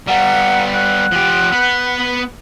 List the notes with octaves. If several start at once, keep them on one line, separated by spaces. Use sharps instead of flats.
G3 B3 F5 F#5 A#5
F#5 F#6
F3 G4
B3 B4